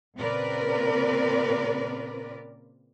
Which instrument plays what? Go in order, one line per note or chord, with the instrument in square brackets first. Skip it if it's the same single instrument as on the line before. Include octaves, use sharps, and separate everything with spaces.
[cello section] A#2 C#3 C4 A#4 B4 D5